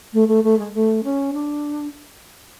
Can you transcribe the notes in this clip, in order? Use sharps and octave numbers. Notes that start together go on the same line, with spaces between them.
A3
A3
A3
G#3
A3
C#4
D4